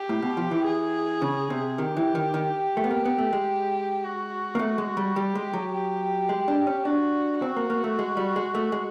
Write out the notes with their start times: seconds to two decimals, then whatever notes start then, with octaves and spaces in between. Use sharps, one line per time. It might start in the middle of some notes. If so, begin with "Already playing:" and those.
Already playing: G4
0.09 A2
0.22 B2
0.37 F3
0.51 E3
0.65 G#4
1.22 C#3
1.50 C3
1.78 D#3 G4
1.97 E3
2.15 D#3
2.34 D#3
2.77 A3
2.84 B3
2.91 A#3 G4
3.05 B3
3.18 A3
3.33 G#3
4.04 F#4
4.55 A#3
4.59 A3
4.78 G#3
4.97 G3
5.16 G3 G4
5.35 G#3
5.53 F#3
5.73 G4
6.29 G#3
6.48 D4
6.67 C#4
6.85 D4 F#4
7.42 C4 F#4
7.56 A#3
7.70 A#3
7.84 A3
7.99 G#3
8.17 G3
8.36 G#3
8.55 A3
8.72 G#3